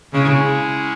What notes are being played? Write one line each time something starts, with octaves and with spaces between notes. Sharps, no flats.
C#3 G#3 C#4 E4 G#4